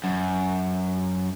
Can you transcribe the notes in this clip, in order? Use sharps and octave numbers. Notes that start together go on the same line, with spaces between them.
F#2